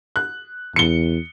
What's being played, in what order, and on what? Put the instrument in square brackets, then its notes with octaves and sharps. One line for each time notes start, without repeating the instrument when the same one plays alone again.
[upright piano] F#6
[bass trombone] E2 [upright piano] C#7 G7